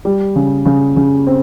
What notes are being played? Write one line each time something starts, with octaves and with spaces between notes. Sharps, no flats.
G3
C#3
C#3
C#3
C4